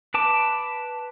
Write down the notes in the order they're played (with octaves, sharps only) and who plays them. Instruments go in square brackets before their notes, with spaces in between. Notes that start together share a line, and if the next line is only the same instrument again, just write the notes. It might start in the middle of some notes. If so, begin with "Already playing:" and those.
[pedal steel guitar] B4 A5 D6